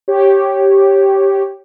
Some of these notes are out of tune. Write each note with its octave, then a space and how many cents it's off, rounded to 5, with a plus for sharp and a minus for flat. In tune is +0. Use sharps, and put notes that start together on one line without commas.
G4 -5 C#5 -15